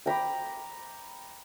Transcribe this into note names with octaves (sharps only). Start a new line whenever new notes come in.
G5 A#5 B5 D6